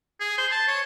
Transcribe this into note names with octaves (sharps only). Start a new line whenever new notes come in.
G#4
C5
A5
C#5